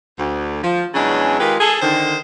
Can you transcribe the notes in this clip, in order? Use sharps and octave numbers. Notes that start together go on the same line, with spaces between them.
D2
F3
E2 C#3 F#3 G#3 C#4 D4
D#3 G#3 F4 G4 G#4 B4
G#4 A4
D3 D#3 C5